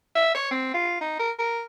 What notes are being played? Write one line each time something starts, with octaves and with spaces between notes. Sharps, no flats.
E5
C#5
C4
F4
D#4
A#4
A#4